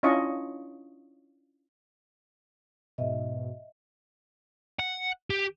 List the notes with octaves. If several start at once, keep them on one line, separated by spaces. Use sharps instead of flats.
C#4 D4 E4 F4 D#5 C#6
G#2 B2 D#5 E5
F#5
G4